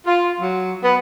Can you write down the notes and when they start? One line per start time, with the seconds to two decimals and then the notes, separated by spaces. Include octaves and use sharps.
0.06 F4
0.40 F#3
0.83 B3